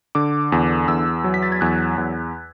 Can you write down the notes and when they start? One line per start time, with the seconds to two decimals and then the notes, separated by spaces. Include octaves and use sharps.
0.15 D3 D6
0.52 E2
0.88 E2 E6
1.24 F#3
1.34 B6
1.43 A6
1.52 G#6
1.61 E2 F#6
1.98 E2